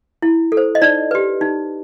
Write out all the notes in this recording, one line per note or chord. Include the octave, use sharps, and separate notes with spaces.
E4
A4
C5
D#5
D#4 D5
G4 B4
D#4